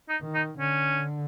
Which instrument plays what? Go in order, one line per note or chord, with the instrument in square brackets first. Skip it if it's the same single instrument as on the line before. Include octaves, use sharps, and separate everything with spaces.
[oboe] D#4
[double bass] D#3
[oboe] D#4
[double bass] D3 [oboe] C#4